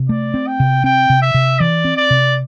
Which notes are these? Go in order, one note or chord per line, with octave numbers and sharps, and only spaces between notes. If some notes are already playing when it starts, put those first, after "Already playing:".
Already playing: C3
A3 D5
C4
G5
C3
C4 G5
C3
E5
C3
E3 D5
C4
D5
C3